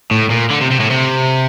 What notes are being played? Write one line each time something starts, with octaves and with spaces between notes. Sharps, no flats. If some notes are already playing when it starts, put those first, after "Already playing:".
A2
A#2
D3
C3
C3
A2
C3